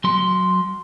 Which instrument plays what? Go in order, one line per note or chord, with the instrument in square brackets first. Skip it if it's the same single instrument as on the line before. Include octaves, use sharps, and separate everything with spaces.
[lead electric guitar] F#3 C6